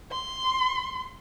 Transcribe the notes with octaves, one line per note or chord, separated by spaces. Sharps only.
C6